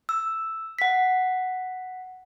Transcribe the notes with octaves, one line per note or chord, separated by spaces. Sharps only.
E6
F#5 B6